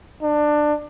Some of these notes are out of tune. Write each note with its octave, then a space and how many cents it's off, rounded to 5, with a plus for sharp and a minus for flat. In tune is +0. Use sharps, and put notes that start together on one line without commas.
D4 +20